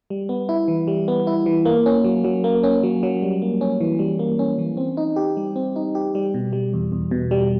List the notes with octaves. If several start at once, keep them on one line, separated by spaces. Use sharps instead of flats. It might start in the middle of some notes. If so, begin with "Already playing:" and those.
G3
B3
E4
E3
G3
B3
E4
E3
A#3
C#4
F#3
F#3
A#3
C#4
F#3
F#3
G3
A#3
C#4
E3
G3
A#3
C#4
E3
C4
D#4
G4
G3
C4
D#4
G4
G3
B2
G3
E2
E2
B2
G3